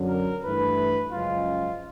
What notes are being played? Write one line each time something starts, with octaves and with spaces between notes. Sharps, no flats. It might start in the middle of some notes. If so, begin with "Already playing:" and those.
Already playing: F#2 D3 F#3
A#4
G2 E3 A3 B4
F#2 C#3 F3 G#3 F4